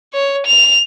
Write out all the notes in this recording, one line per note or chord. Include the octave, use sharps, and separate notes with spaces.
C#5
F7